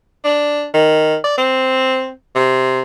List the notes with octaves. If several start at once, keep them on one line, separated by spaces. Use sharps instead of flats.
D4
D#3
D5
C4
C3